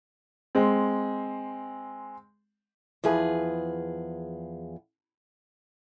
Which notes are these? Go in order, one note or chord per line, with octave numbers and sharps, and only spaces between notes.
G#3 C4
E2 F3 G#4 B4